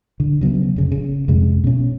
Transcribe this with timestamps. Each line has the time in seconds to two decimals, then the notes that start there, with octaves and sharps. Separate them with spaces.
0.20 D3
0.41 C#3 F#3 G3 B3
0.76 F1 C#3
0.92 C#3
1.28 F2 C3 G#3
1.64 B2 C#4